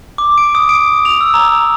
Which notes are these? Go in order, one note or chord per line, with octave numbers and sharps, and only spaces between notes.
D6
D7
D#6
D7
F7
E6
A#5